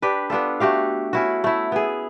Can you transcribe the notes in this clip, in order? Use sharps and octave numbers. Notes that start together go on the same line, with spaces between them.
D4 G4 B4
B3 D4 F4 A4
A3 F#4 G4 F5
C#4 E4 F#4
A3 E4
B3 G#4